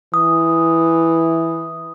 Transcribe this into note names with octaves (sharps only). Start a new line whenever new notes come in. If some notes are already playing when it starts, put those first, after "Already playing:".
E3 D#6